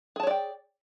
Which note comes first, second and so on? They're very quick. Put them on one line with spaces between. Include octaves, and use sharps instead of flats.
G#4 A5 C#5 D5 G5